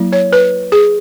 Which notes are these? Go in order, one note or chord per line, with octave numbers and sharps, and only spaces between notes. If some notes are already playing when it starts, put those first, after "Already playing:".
Already playing: F#3 A#3 E4
C#5
B4
G#4